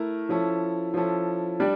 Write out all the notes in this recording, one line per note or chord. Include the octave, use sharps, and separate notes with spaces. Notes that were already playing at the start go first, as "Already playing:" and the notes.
Already playing: A3 E4 A#4
F3 C#4 E4 A4
F3 C#4 E4 A4
G3 D4 G4 D5